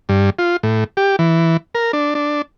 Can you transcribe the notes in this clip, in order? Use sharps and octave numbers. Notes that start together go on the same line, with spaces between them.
G2
F4
A2
G4
E3
A#4
D4
D4